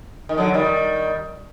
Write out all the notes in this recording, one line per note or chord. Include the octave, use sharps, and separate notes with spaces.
D#3
D3 F#3
D#3 G3